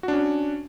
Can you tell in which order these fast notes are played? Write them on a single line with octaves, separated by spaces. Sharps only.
F#4 D4 C#4